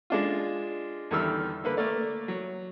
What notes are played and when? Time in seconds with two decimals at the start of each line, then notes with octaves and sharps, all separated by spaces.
0.10 G#3 D4 F4
1.11 E2 D3 D#3 G3 E6 F6
1.64 D3 A#3 B4
1.77 A3 A#3 A#4 D5
2.28 F#3